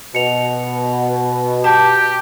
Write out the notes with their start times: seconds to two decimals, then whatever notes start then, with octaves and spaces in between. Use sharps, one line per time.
0.15 B2 C#7 F7
1.64 G4 A5